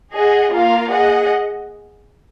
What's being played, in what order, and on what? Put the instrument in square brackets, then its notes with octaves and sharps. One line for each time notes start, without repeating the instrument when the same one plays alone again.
[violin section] G#4 D#5 F#5
A#3 F4 A#4 F5
G#4 D#5 F#5